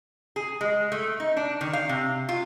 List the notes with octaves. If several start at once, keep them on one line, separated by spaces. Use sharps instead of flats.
G#4
G#3
A3
D#4
D4
D#3
F5
C3
F4